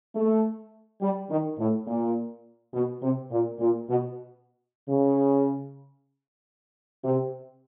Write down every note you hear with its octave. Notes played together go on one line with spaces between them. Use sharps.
A3
G3
D#3
A2
A#2
B2
C3
A#2
A#2
B2
C#3
C3